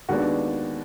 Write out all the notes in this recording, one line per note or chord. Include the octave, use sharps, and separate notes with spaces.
D#2 D#3 G#3 B3 D4 F#4